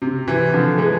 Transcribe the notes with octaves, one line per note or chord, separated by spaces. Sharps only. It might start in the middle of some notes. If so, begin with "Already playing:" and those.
C3
C3 E3
D3 F3
E3 G#3